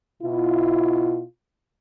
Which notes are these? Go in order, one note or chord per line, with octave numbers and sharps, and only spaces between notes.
B2 E4 F4